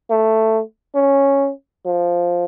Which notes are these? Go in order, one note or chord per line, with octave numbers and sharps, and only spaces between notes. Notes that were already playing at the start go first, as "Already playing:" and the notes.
A3
C#4
F3